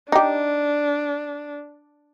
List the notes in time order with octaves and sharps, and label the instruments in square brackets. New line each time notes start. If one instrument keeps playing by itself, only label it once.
[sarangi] D4 [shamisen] D#4 G4